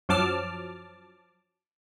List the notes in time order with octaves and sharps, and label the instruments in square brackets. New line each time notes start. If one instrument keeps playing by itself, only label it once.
[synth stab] F#2 F3 F#3 A5 D6 F6